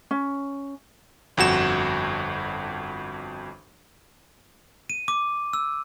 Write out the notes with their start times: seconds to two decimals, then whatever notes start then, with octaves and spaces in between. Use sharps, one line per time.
0.11 C#4
1.37 G1 F2 F#4 E7
4.90 D#7
5.08 D6
5.53 E6